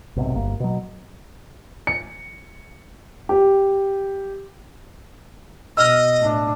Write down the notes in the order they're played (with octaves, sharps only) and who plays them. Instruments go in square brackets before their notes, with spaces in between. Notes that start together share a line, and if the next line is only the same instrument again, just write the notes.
[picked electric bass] B1 G#2 C3
G1 A#3
B2 F#3
[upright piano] C#7
G4
[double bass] B2 [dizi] D#5 [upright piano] E6 F6
[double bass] A2 D4